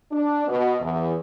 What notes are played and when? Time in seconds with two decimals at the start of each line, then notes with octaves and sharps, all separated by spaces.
0.11 D4
0.47 B2
0.80 E2